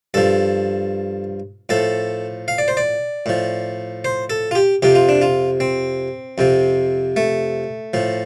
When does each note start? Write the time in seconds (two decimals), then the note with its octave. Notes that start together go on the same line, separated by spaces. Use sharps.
0.14 G2 F3 A4
1.69 A2 F3 A4
2.48 F5
2.58 D5
2.68 C5
2.77 D5
3.26 A2 F3
4.05 C5
4.30 A4
4.51 F4
4.55 G4
4.82 F2 C3 F3 G4
4.95 F4
5.09 D4
5.22 F4
5.60 C4
6.38 F2 C3 F3
7.16 A3
7.94 A2 F3